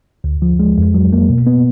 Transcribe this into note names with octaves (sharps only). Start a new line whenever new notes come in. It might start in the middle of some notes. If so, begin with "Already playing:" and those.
D2
F3
G#3
F2
F#3
A#3
B2
B3